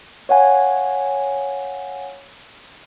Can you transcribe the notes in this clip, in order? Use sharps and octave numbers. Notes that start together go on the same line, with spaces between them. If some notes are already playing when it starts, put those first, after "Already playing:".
C#5 F5 F#5 G#5